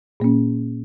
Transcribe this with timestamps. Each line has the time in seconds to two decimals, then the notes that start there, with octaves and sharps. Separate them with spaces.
0.20 A#2 A#3 C#4